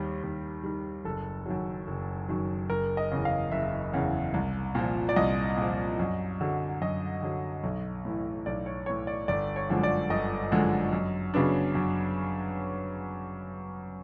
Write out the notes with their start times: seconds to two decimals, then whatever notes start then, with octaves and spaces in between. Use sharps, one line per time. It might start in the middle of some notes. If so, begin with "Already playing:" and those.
Already playing: D#2 D#3 G3
0.23 D#2
0.63 D#3 G3
1.05 F#1 A4
1.46 F#2 D#3 F#3
1.87 F#1
2.28 F#2 D#3 F#3
2.70 F#1 A#4
2.97 D#5
3.11 E2 C#3
3.25 F5
3.51 F#1 E5
3.93 E2 C#3
4.34 C2
4.75 A#2 F3
5.09 D5
5.16 C2 D#5
5.57 A#2 F3
5.99 F#2
6.41 D3 F#3
6.82 F#2 D#5
7.22 D3 F#3
7.63 B1
8.05 A2 E3
8.46 B1 D5
8.66 C#5
8.86 A2 E3 C#5
9.07 D5
9.28 G1 D5
9.56 C#5
9.70 F#2 D3 F3 G#3
9.83 D5
10.10 G1 D#5
10.52 F#2 D3 F3 G#3
10.93 F#2
11.34 C#3 F#3 B3 D4
11.75 F#2